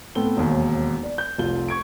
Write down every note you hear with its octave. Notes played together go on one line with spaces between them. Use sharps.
A2 B3 C4 A4 G7
E1 D#2
D5
G6
F1 C2 F4 G7
C#6 G#6 D7